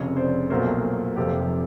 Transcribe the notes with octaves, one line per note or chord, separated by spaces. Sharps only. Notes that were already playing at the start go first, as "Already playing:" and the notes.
Already playing: F1 F2 C#3 C#5 D#5
C5 D5
B1 A#2 F#3 A3 A#4 C5
F1 F2 C3 F3 G4 A4